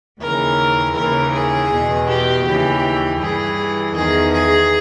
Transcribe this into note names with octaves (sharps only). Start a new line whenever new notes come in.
D#2 C#3 E3 A#4
D#2 C#3 E3 A#4
G#4
E2 B2
G4
D#2 C#3 E3 G4
G2 E3 G#4
E2 D#3 G#4
G#4